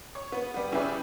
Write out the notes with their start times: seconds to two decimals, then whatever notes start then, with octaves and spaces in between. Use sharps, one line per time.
0.15 C#5
0.32 B3
0.54 G3 B3
0.72 C#4 E4 G4 G#4 B4 D5